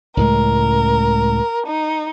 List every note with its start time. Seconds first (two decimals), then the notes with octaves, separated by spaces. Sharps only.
0.17 C#2 A2 G#3 A#4
1.66 D#4